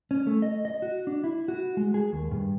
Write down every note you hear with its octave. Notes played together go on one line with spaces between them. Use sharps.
C#4
A3
D#5
D#5
F#4
D4
E4
F#4
G#3
G#4
D#2
G2